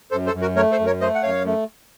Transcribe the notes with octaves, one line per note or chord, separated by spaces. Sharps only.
F#2 A4 C5
A4 C5
F#2
F#4 A#4
A3 A#4 C#5
A4 C5
F#2
A#4 C#5
A3 C5 D#5
F#5
F#2 C#5 F5
A3